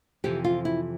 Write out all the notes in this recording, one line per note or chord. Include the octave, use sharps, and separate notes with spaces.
F2 C3 E3 G4
F4
E4